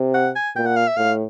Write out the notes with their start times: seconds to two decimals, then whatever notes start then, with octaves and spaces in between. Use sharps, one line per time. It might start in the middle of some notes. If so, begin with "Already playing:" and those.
Already playing: C3
0.14 F#5
0.36 G#5
0.56 A#2 G5
0.66 F#5
0.76 F5
0.88 E5
0.97 A2 F5